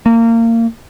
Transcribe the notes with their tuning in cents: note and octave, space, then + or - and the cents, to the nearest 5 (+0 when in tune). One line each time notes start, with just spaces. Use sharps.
A#3 -25